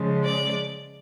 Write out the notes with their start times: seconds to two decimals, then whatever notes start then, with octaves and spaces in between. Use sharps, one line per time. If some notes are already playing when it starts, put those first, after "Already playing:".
Already playing: C#3 F3 G#3
0.22 D5